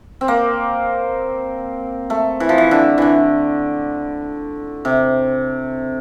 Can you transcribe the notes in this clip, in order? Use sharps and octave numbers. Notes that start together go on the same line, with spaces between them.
C4
A#3
A3
E3
F3
E3
D3
D3 E3
C3